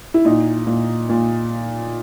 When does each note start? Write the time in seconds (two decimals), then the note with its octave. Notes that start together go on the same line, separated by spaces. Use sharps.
0.14 E4
0.25 A#2 D#4
0.67 A#2
1.09 A#2